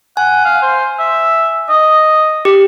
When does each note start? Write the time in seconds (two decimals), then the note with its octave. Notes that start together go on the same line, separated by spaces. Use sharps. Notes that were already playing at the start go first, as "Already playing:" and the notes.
0.17 F#5 G#5
0.45 F5
0.62 C5
1.00 E5
1.70 D#5
2.45 G4